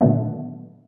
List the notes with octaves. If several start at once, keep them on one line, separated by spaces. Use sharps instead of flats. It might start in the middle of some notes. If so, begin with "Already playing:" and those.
A#2 D3 D#3 F#3 A3 B3